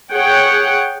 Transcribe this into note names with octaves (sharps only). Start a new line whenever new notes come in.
G#4 C#5 F#5 G5